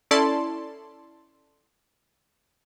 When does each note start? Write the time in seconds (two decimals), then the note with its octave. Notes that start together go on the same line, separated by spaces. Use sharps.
0.11 C#4 E4 A4 D5 A5 C6